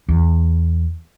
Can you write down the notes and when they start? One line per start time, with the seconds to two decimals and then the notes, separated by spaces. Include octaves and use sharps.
0.09 E2